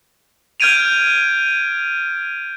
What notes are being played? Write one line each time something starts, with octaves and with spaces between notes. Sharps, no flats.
F6 G6 G#6 D7 D#7 F7